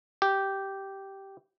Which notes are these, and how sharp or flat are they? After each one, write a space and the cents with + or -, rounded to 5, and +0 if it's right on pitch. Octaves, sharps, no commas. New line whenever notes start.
G4 -10